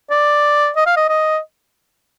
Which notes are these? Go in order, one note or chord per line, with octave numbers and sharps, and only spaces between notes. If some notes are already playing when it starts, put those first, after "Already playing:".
D5
D#5
F5
D#5
D#5